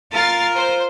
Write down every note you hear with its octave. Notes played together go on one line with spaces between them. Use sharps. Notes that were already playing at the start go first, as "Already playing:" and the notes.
F4 A#4 F6 A6 C7
C5